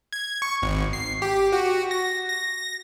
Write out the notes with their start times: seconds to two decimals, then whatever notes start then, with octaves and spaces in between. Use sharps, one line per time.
0.13 G#6
0.42 C#6
0.62 G#1
0.93 C7
1.22 G4
1.52 F#4
1.91 A#6
2.30 A#6